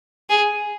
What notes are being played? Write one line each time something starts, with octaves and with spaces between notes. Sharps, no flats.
G#4